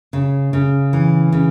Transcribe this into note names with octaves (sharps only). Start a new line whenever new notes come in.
C#3
C#3
E3
C#3